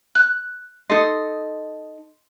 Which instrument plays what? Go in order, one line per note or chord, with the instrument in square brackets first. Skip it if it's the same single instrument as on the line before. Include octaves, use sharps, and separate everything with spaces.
[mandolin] F#6
[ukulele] D#4 A4 D#5 [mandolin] C6